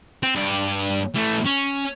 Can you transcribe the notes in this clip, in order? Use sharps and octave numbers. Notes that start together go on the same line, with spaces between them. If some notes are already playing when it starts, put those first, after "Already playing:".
C4
G2 D5
E3 A3
C#4